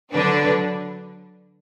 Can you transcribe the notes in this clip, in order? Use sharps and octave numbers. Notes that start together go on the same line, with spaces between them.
D3 F#3 D4 B4